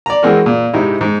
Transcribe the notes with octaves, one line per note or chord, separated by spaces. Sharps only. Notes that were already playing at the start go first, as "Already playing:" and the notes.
D5 A#5
E3 G#3 C4 F#4 A#4
A#2
G#2 C3 D#4 E4
G#2